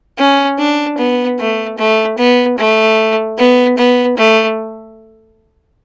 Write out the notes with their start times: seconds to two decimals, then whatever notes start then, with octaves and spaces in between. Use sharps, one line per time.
0.18 C#4
0.59 D4
0.98 B3
1.39 A3
1.78 A3
2.18 B3
2.58 A3
3.38 B3
3.77 B3
4.17 A3